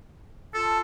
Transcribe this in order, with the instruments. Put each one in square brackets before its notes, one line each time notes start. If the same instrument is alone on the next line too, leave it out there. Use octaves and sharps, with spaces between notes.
[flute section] F4 A5 [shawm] A4